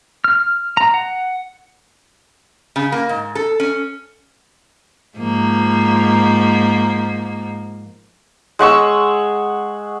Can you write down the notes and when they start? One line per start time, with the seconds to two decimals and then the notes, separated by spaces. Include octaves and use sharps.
0.24 F6
0.77 A#5
0.94 F#5
2.76 C#3
2.92 A#3
3.09 G#2
3.35 A4
3.60 C#4
5.18 G#2 F3 A#3
8.59 G#3 F#5 C#6 E6